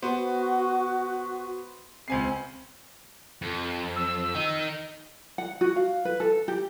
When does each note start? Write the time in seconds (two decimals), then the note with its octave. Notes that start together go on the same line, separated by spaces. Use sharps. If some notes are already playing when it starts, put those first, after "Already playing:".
0.03 B3 F#4 C5
2.08 C#2 C4 G#5 C7
3.42 F2
3.96 E6
4.35 D#3 D#4
5.38 F#5
5.61 F#4
5.76 F5
6.05 B4
6.20 A4
6.48 G4